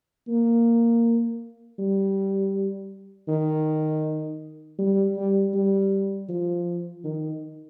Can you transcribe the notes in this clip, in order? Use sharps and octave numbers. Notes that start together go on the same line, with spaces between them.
A#3
G3
D#3
G3
G3
G3
F3
D#3